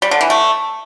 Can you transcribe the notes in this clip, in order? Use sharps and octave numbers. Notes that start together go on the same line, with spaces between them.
G3
D3
E3
A3